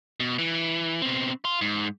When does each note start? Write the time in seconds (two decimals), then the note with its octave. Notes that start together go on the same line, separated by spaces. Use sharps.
0.20 B2
0.39 E3
1.02 B2 C4
1.45 F5 C6
1.61 G#2